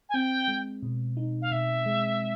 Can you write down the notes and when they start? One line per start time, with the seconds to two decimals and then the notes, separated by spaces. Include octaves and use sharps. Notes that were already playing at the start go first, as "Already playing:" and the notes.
0.09 G#5
0.14 C4 G5
0.48 G#3
0.83 B2
1.17 D#4
1.42 F5
1.51 B2 E5
1.86 G#3